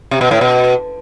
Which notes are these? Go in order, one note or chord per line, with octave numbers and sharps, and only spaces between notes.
C3
B2
A2
B2